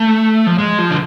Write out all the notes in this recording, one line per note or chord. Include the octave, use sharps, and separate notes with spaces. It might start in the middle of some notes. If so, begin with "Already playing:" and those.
Already playing: A3
F3
G#3
F3
D3